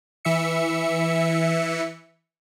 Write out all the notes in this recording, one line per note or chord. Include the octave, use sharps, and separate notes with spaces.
E3 E5 C#7